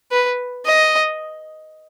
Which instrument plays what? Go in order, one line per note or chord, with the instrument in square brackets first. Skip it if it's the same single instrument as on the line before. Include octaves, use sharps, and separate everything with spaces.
[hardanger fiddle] B4
D#5